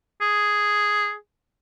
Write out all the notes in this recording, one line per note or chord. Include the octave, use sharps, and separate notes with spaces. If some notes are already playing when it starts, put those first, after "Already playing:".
G#4